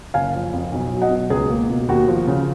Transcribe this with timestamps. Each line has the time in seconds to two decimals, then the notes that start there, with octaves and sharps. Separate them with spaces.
0.14 F#1 F5 G#5
0.34 F3
0.53 F2
0.72 B1
0.92 F#3
1.02 D#5 F#5
1.11 B2
1.30 C#2 G#4
1.50 A#3
1.70 B2
1.88 D#2 F#4
2.08 F3
2.28 C#3